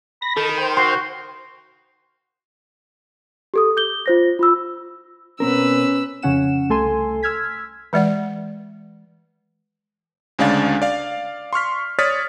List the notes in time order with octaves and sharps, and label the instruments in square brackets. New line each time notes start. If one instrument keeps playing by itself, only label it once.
[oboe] B5 [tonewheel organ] A#6
[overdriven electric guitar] D#3 [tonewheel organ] A4
[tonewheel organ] C5 G5
[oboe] F#4 [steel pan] C6
[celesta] G4 A4 D#6
D6 G6 G7
F4 C5 A#6
F4 B5 E6
[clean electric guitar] B2 C4 A#4 [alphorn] C#4 [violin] B4 E6
[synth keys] F2 C#3 C#4 F#5 E7
C2 A3 A4 G#5 C6
E6 F6 G#6 B6
[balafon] E3 G#3 D5 F#5
[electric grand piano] D2 C#3 G#3 D4 F5 A6
D5 F5
C6 C#6 F6 B6
C#5 D5 D#6 F6 A6 B6